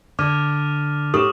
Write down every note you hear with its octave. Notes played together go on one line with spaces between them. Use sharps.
D3 D5 D6 F6 D#7
A2 G4 A4 C#6 D#6 E7